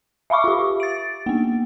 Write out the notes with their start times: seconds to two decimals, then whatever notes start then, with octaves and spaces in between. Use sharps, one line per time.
0.30 E5 F5 B5 C#6 D6
0.44 F4 G4
0.80 A6 D7
1.26 A#3 B3